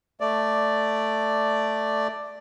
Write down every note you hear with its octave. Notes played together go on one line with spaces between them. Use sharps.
A3 D5